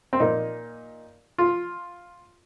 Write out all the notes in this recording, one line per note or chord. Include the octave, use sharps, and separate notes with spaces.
C4
A#2 A#3 D#4
F4